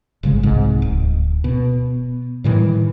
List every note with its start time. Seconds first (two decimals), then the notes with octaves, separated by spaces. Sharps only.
0.23 G1 C#3 G#3
0.43 C2 G#2
0.82 D1
1.44 B2
2.44 A2 D#3 E3 G3